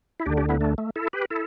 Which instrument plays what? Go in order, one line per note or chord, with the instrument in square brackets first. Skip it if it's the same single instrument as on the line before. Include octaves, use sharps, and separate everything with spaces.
[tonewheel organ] E4
D2 D3 D4 G4
D4 G4
B3 E4
A3 D4
A3
E4 A4
G4 B4
E4 A4